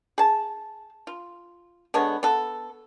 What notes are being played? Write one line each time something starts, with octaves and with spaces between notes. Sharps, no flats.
G#4 A5
F4
D3 G#3 B3 C#5
B3 A4